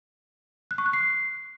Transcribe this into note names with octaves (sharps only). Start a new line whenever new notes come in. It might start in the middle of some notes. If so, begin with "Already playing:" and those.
F#6
C#6
F#6
C7